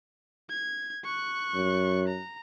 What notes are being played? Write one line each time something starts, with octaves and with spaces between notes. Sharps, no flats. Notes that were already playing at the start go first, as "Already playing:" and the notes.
G#6
C#6 F#6
F#2
A#5